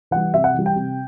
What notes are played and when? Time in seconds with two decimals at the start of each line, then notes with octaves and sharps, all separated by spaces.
0.11 E3 G3 F#5
0.34 C3 E5
0.44 F#5
0.54 E3 G3
0.66 G5
0.76 C3